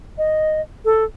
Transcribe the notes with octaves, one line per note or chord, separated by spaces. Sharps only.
D#5
A4